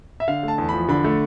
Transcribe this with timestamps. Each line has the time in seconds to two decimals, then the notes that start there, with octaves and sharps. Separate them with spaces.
0.20 E5
0.28 D3 F5
0.43 A3 A5
0.58 E2
0.69 F3 B5
0.88 D3 B5
1.04 A3